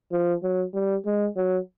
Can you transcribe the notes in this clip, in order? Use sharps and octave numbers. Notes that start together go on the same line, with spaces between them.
F3
F#3
G3
G#3
F#3